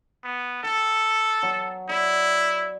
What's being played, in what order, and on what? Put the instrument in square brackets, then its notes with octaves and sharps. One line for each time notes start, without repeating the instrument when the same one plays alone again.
[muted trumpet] B3
[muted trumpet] A4 [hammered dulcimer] G5
[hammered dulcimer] F#3
[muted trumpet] E4 [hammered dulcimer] D5